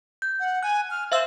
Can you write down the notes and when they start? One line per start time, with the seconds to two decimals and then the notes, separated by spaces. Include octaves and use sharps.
0.22 G6
0.40 F#5
0.63 G#5 F#6
0.91 F6
1.12 C5 E5 F5 E6